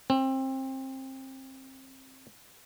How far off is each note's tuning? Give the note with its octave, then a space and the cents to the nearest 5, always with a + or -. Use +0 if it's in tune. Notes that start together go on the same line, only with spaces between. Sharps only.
C4 +25